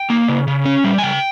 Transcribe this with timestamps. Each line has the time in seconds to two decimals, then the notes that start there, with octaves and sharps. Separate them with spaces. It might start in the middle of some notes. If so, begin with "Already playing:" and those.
Already playing: G5
0.10 A#3
0.28 C#3
0.48 C#3
0.65 C#4
0.84 G3
0.98 G#5
1.03 C#3 G5